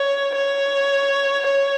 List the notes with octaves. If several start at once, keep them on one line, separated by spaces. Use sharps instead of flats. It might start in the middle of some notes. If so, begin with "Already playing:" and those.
Already playing: C#5
C#5
C#5